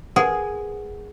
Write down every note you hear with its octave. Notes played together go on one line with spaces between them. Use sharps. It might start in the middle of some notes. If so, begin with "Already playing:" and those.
G#4 A#4 B4 F#5